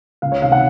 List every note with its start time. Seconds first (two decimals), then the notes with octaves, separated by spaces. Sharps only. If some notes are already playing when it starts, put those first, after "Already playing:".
0.22 C#2 F5
0.32 C#5
0.42 C3 D#3 F5
0.52 F#5